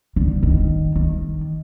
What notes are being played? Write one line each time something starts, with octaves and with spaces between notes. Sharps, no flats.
D3
D#3
D#3